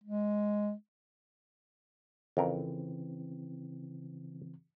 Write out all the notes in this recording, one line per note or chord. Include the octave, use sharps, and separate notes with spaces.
G#3
F2 C#3 E3 C4 A#4